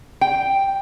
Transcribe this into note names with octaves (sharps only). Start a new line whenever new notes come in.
G5